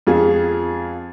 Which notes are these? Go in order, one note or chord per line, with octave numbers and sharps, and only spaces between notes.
F2 F4 G#4